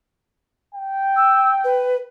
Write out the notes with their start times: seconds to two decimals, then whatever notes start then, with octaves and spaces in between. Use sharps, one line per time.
0.75 G5
1.16 E6
1.64 B4